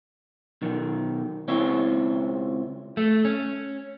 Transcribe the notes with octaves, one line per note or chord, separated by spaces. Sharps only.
B1 D#3
C#2 C4 E4 C#5 E5
A3
C#4